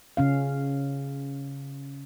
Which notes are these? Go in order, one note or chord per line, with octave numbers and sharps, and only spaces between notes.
C#3 C#4 F5